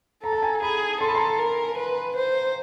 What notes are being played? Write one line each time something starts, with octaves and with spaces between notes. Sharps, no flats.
A4 A#5
A5
G#5 A#5
G#4 A5 B5
A4 C6
B5
A#5 C6
A#4
B4
C5